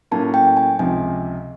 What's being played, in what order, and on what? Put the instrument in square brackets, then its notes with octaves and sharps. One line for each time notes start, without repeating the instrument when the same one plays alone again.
[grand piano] A2 F#3 A#3 C#4 [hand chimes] A5
[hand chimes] G5
G#5
[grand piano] C#2 C3 F3 [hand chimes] G#5